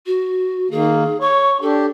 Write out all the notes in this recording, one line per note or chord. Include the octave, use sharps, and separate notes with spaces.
F#4
D#3 A#3 G#4
C#5 C#6
D4 G4 A4